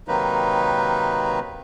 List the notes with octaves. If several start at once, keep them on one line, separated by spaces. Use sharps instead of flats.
C3 D#3 F#3 A#3 D#4 B4